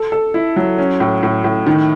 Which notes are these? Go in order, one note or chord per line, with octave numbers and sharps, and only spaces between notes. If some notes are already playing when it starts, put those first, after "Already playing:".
Already playing: A4
A4
E4
F#3
C#4
A2
A2
A2
D#3